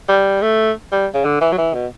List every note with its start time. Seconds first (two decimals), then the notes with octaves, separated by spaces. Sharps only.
0.09 G3
0.42 A3
0.92 G3
1.14 C#3
1.25 D3
1.41 E3
1.52 F#3
1.58 E3
1.74 B2